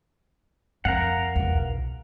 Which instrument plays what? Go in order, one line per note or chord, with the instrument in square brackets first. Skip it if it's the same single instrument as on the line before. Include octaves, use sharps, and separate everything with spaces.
[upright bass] F2 [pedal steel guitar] A#4 F5 F#5
[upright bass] B1 E2